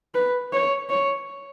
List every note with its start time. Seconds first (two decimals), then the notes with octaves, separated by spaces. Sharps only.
0.15 B4
0.53 C#5
0.90 C#5